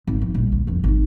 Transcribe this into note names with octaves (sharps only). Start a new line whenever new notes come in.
G#1
F3
A#1 G3
D2
G1 F2
G#1 D#4